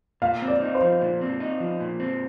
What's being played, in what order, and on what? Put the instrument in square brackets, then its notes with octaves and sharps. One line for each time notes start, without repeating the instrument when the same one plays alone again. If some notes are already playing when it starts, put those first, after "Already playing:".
[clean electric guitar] A#2 [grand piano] F5
[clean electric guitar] C4
[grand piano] D5
[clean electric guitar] D#4
[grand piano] C5
[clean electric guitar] F3
A#2
C4
D#4
F3
A#2
C4